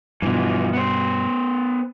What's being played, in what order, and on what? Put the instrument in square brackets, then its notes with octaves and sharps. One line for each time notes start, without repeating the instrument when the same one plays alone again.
[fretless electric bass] G2 B2 [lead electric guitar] E3 F3
[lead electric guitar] B3 C5